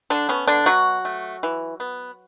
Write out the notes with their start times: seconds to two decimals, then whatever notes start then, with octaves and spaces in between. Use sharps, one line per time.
0.10 D3 D4
0.29 B3 C#4
0.47 D3 D4
0.66 B2 F#3 F#4
1.05 A3
1.43 E3
1.80 B3